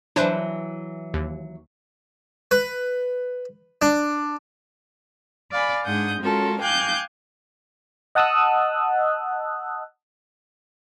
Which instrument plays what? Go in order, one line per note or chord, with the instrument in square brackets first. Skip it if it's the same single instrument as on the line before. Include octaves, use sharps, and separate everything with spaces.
[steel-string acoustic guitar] E3 F#3 [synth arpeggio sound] D4 B4 C5
[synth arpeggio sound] D#2
[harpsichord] B4
D4
[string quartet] D5 F5 G#5 B5
G#2 D4 G#4 F#5 D#6 G6
G#3 C#4 F4 F#4 A4 A#4
F5 G5 G#5 D6 F#6 G6
[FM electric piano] D#5 F#5 A5 D#6 E6 F#6